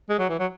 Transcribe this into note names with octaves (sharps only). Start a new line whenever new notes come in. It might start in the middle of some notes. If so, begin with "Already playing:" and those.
G#3
F#3
E3
F#3